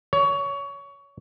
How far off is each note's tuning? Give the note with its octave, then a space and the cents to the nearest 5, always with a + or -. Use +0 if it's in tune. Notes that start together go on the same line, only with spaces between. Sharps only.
C#5 +20